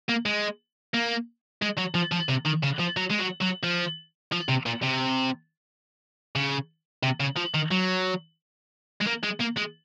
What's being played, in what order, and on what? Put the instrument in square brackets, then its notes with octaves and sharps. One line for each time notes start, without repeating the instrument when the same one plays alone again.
[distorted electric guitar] A#3
G#3
A#3
G#3
F#3
F3
F3
C3
D#3
C#3
F3
F#3
G#3
F#3
F#3
F3
F3
C3
A#2
C3
C#3
C3
C#3
F3
D#3
F#3
G#3
A#3
G#3
A#3
G#3